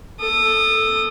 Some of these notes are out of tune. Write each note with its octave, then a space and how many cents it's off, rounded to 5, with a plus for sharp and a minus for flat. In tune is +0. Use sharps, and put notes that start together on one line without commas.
A4 +0 D#6 -25